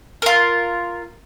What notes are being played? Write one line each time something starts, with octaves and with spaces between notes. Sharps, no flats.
F4 A#4